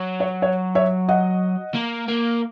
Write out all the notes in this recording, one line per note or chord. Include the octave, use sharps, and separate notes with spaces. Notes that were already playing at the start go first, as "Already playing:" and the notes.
Already playing: F#3
C#5
C#5
C#5 E5
D#5 F#5
A#3
A#3